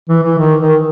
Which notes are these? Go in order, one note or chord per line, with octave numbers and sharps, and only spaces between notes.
E3
E3
D#3
D#3